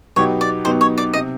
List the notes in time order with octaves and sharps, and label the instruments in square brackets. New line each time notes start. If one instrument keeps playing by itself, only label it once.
[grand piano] B2 F#3 B3 D#4 G4 [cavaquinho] C#5
[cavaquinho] D5
[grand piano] B2 F#3 B3 D#4 G4 [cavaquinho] C5
[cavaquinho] C#5
D5
D#5
[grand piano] C3